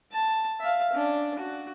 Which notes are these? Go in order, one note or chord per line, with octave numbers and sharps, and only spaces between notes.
A5
E5 F5
C#4 D4
F#4